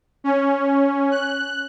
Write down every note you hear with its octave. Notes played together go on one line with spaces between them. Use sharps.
C#4
F#6